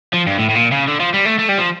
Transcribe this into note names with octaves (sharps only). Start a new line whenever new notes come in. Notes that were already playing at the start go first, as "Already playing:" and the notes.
F3
G2
A2
A2
A#2
C#3
D3
F3
G3
A3
A3
G3
F3